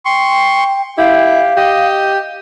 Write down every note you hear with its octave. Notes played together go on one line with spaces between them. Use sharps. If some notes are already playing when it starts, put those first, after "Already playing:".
G5 C6 C#6
E4 G4 F5
G4 D#5